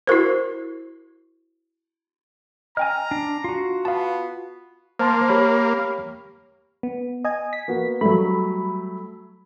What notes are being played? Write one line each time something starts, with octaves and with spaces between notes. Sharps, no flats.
E4 F#4 A#4 C5
D#5 G5 G#5 A#5 F6
D4
F4 F#4
B3 F5 A5
A#3 C5 A5 C6
G4 C#5 B5
B3
D#5 G#5
B6
A#3 B3 F#4
F#3 G3 A3 B5